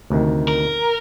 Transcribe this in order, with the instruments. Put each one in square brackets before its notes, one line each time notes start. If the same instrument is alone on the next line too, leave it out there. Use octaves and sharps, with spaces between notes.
[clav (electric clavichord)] D2 C3 D#3
[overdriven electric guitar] A#4